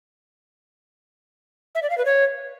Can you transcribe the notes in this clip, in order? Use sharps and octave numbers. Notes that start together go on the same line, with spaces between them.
E5
D5
F5
B4
C#5